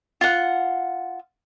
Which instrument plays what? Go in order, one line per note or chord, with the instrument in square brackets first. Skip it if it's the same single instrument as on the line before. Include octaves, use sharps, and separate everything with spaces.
[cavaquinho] F4 F#5